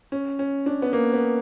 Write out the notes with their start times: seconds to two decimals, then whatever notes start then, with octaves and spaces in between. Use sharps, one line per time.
0.12 C#4
0.39 C#4
0.66 D4
0.82 B3
0.93 A#3
1.13 B3